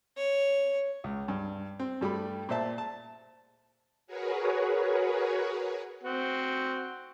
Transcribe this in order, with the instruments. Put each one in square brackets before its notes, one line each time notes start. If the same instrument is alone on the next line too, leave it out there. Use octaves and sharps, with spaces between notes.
[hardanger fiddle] C#5
[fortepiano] C#2
G2
C4
G2 G3 A3 B5
A#2 C5 E5 A5
A5
[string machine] F#4 G#4 A#4 B4 C#5
[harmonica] C4 F#4